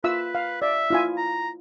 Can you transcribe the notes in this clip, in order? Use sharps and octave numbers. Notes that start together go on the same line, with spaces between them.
F4 B4 E5 E6
F5
D5 E5
E4 F4 G#5
A#5